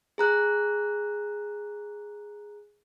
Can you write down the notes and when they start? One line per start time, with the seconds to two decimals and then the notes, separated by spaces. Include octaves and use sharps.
0.18 G#4 A#5 F#6